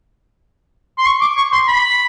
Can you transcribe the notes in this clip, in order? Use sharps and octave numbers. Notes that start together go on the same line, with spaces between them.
C6
C#6
D6
C#6
C6
B5